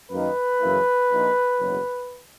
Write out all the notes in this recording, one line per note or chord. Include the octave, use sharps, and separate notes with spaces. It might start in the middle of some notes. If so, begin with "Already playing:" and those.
F#2 D#3 A#3 D#4 B4
F#2 C#3 E3 A#3 E4
A#1 A#2 A#3 D#4
F#1 E2 B2 F#3